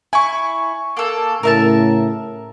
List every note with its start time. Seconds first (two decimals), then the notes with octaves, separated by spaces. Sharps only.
0.13 E4 G#5 C#6
0.97 A#3 A4
1.43 A2 C#3 A#4 E5 A5